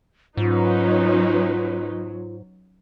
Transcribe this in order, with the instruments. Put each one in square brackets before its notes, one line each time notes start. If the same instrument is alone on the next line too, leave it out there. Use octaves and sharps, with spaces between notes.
[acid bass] G#2 [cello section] F#3 [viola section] C#4 D#4 B4 [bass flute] F4